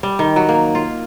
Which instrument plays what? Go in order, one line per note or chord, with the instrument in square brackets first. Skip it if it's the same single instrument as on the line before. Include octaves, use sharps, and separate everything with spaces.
[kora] G3
D#3
F#3
A#3
F4